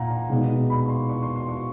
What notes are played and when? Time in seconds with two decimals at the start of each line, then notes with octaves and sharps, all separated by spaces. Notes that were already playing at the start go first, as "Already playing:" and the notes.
Already playing: A#2 F5 F#5 A#5
0.10 A#5
0.30 B2 G#3 B3 D#4
0.70 B5
0.84 C#6
0.89 C6
1.09 C#6
1.22 C6
1.36 C6
1.48 C#6